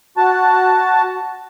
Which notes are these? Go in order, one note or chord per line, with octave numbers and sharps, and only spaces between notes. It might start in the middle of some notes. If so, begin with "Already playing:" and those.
F#4 A5